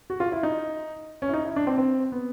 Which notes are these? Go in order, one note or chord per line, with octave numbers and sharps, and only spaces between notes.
F#4
F4
E4
D#4
C#4
E4
D#4
E4
D4
C4
C4
B3